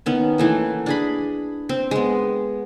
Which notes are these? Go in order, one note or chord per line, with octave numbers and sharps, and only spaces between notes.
D#3 B3 C#4
E3 A3 A#3
D4 G#4 B5
C4
G#3 B3